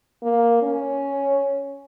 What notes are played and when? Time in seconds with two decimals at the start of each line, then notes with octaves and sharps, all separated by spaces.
0.23 A#3
0.62 C#4